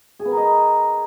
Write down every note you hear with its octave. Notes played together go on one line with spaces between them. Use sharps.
G#4
B3
A#4
D#5